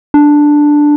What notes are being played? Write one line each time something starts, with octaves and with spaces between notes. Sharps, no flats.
D4